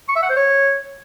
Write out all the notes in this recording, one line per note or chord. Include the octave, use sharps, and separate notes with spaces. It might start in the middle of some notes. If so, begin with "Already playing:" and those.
C#6
E5
F#5
C5
C#5